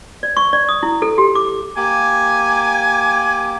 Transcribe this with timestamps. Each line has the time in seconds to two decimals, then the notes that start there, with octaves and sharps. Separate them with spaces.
0.23 D5
0.37 C#6
0.53 D5
0.69 D#6
0.83 E4
1.02 A4
1.18 G4
1.35 D6
1.76 A#3 G4 G#5 D6